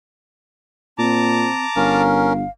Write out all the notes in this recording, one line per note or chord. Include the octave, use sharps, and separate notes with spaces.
A#2 C4 A5 A#5 D6
G1 C#4 A#4 F5